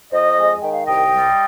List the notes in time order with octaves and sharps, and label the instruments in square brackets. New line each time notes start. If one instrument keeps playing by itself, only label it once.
[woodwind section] F2 C5 D#5
G#3
D#3 G5
F5
C2 D#5 G5
G3